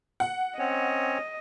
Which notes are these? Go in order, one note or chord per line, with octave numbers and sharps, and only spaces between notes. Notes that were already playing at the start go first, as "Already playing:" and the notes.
F#5
C4 C#4 C#5 D#5